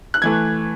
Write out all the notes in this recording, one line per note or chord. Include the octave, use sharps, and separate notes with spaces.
F#6
E3 A3 G#6